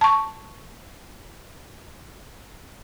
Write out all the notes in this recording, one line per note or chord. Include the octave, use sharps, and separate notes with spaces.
A5 C#6